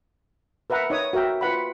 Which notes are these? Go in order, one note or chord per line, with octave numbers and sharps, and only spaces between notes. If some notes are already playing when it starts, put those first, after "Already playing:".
A#4 B4 E5 F#5 A#5
D#4 C#5 D#6
F#4 A#4 E5 G5
F4 B4 F#5 B5